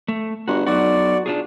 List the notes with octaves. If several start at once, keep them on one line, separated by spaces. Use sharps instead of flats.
A3
G1 F#4
B1 F#4 D5
D4 F4 G#4